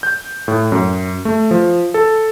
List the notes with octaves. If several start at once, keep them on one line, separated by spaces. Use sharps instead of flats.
G6
A2
F#2
A3
F3
A4